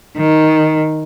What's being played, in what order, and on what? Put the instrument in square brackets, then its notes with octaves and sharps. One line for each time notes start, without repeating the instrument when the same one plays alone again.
[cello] D#3